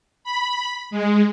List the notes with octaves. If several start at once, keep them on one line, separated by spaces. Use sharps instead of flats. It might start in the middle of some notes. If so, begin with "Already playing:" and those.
B5
G#3